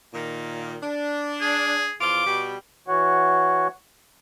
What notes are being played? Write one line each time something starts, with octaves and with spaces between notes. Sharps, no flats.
A#2 D#3
D4
G#4
E2 F3 F4 D6
B2 G3
E3 F#4 C#5 F#5